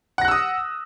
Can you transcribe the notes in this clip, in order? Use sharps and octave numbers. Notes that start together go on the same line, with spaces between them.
F#5 D#6 E6 F#6 A#6